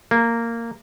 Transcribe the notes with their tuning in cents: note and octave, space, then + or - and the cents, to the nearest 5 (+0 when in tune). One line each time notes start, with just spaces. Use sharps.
A#3 -10